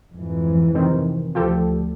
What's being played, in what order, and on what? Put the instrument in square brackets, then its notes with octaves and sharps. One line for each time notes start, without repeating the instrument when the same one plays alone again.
[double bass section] F2 G#2 E3
[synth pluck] C3 D#3 C4
[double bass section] D2 [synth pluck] F3 G4 A4